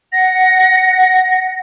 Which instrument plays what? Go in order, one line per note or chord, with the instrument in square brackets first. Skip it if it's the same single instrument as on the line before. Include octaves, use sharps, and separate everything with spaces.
[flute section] F#5 [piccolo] A#6